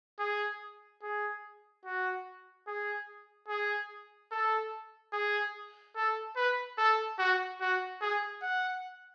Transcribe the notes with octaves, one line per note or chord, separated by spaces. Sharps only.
G#4
G#4
F#4
G#4
G#4
A4
G#4
A4
B4
A4
F#4
F#4
G#4
F#5